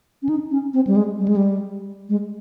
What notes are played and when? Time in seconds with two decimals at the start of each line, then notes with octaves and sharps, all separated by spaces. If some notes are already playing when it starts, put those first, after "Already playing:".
0.22 C#4
0.29 D#4
0.51 C#4
0.74 C4
0.87 G3
0.96 G#3
1.19 G3
1.28 G#3
1.36 G3
2.09 G#3